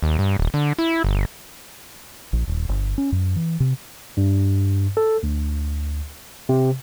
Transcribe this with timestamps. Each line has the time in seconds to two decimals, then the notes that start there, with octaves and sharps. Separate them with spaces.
0.03 D#2
0.19 G2
0.39 D#1
0.54 D3
0.79 E4
1.04 G1
2.33 A#1
2.48 D#1
2.69 G1
2.98 C#4
3.12 F#2
3.36 E3
3.60 C3
4.17 G2
4.97 A4
5.23 D2
6.49 C3